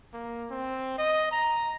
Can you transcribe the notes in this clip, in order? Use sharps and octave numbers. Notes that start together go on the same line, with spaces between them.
A#3
C4
D#5
A#5